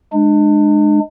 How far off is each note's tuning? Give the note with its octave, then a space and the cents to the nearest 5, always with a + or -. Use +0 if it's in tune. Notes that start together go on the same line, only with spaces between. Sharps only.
G#3 +10 D4 +35